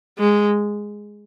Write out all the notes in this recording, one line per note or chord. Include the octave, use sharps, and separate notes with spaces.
G#3